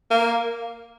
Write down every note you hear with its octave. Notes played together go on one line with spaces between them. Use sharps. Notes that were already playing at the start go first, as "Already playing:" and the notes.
A#3